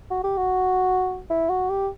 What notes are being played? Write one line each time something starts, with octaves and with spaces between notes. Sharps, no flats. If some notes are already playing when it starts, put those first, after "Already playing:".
F#4
G4
F#4
E4
F#4
G4